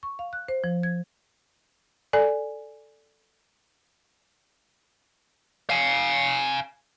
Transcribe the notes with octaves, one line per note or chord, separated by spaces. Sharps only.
C#6
F5
F#6
C5
F3
G#6
A4 D5 G#5
F5 G#5